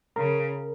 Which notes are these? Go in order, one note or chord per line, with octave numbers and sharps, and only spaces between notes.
C#3 A#4